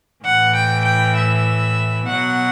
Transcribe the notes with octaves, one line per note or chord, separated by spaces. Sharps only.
A2 E3 F#5
G5
G5
E5
B2 F#3 F#5